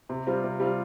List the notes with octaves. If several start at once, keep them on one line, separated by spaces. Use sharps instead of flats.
C3
G3 C4 F4
C3
G3 C4 F4